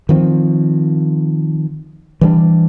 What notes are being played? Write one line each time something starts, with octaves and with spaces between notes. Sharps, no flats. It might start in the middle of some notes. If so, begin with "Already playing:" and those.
D#3 F3 C4
E3 G3 D4